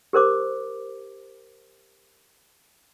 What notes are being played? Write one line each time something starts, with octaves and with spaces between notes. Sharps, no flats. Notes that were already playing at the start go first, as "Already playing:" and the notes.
G4 A#4 C5 D6